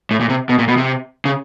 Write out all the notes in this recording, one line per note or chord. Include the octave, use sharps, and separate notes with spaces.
A2
A#2
C3
B2
A#2
B2
C3
C#3